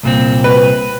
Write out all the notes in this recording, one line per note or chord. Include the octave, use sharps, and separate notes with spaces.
C2 A#2 C4
B4